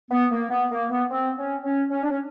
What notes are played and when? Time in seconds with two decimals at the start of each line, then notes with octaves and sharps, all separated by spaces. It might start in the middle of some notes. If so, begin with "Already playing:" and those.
0.11 B3
0.31 A#3
0.50 B3
0.71 A#3
0.90 B3
1.11 C4
1.38 C#4
1.64 C#4
1.91 C#4
2.03 D4
2.10 C#4